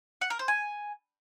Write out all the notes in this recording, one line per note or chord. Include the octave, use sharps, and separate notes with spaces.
F#5
A#4
C5
G#5